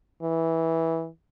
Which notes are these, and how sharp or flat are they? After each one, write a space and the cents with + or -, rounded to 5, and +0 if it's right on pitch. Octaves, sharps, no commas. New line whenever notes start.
E3 -10